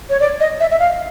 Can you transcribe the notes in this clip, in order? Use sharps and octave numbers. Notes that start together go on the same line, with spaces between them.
C#5
D5
D#5
E5
E5
F5